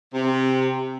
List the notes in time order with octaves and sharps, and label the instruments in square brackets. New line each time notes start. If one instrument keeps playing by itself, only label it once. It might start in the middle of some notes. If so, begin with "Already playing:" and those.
[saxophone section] C3